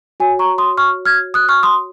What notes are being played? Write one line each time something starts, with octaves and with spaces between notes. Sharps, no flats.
F#4 C#5 G#5
A#5 C#6
C6 D#6
C#6 F6
F6 G#6
D#6 F#6
C#6 F6
C6 D#6